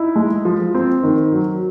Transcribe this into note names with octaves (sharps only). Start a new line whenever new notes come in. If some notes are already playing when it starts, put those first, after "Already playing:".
Already playing: D#4 E4
G#3
F3
C4
D#3
F#3